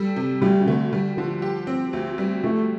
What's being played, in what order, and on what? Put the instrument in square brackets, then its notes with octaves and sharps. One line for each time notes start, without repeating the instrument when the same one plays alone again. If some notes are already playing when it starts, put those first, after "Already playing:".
Already playing: [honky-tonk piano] G3 A4
C3
[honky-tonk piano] D2 [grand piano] G3
[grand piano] C3
[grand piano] D3 [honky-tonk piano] A3
[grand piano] D3 [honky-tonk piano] G3
[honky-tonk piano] D3 [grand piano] F3
[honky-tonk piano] G4
C4
D2
G3
[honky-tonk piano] F3 [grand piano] A3